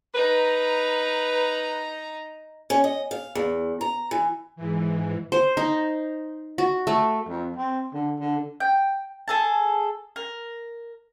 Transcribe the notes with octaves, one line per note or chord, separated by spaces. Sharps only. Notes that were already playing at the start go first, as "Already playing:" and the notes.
D#4 B4 A#5
C#4
D#5
F5
E2
A#5
E3
G#2 E3
C5
D#4
F#4
A3
F2
C4
D3
D3
G5
G#4 A4 A5
A#4